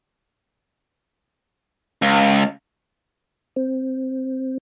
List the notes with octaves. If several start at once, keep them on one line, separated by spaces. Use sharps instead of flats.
C#2
C4